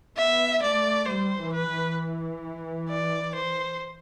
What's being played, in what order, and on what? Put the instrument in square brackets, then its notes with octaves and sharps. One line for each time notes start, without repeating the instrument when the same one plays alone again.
[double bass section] B3 [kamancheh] E5
[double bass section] A3 [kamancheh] D5
[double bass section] G3 [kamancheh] C5
[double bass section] E3
[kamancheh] B4
[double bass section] E3
[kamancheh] D5
C5